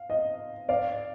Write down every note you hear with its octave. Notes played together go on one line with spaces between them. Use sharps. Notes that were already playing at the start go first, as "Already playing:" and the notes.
Already playing: F5
D#5
D5 F5